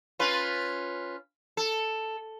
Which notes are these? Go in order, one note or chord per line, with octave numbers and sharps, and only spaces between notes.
C#4 F4 B4
A4